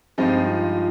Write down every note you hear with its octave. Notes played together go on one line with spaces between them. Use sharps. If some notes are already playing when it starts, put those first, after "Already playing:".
G2 F3 G#3 C4 D#4 G4
F4
F4